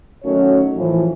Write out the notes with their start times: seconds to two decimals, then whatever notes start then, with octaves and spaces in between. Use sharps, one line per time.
0.24 D#3 F#3 A3 C#4 F#4 C#5
0.77 A2 E3 F3